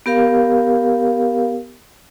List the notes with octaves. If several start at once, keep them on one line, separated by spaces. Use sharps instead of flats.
B3 G4 A#4 F5